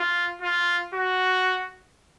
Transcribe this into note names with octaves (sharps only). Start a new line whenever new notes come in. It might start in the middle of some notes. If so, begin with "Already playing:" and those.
Already playing: F4
F4
F#4